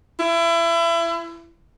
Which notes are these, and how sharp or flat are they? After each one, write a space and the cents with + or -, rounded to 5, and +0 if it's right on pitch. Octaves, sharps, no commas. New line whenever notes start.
E4 +30